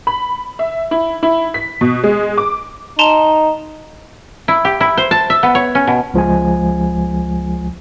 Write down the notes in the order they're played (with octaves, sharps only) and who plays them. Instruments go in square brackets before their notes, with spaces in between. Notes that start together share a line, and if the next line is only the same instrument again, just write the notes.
[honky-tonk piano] B5
E5
E4
E4
B6
B2
G#3
D6
[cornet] D#4 [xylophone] A5 A#5 C6
[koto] E4
G4
E4
C5
A5
E5
B3
C#5
C#4
B2
[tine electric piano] C#2 F3 G#3 G#5